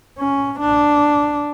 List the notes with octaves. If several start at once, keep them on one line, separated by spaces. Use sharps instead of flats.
C#4
D4